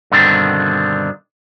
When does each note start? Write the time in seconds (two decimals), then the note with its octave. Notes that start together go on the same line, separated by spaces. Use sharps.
0.12 G2 B2 D3 D#3 C4 D4